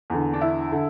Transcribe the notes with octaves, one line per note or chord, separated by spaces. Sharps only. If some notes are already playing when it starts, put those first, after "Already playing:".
E2 D3
D4
E4
D3